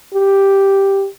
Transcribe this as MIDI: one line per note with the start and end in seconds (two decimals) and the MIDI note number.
0.14 1.07 67